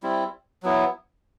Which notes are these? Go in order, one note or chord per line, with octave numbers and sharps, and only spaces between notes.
G3 C4 E4
F#3 B3 E4